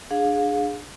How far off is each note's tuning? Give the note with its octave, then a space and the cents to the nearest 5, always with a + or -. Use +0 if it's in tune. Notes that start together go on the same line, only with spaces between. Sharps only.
D4 +15 G#4 +0 F5 +30